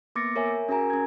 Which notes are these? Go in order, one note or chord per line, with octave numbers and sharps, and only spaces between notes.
A#3 B3 D6 A6 A#6 C#7
A#4 C#5 E5 G#5
C#4 F#4 G#4 A#4 G#5 A#5
C#4 G#6